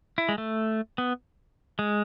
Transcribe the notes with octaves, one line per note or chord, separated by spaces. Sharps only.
E4
G#3
A3
B3
G#3